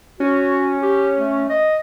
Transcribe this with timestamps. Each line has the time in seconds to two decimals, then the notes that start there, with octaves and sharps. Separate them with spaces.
0.20 C#4 F#4
0.82 G4
1.19 A3
1.50 D#5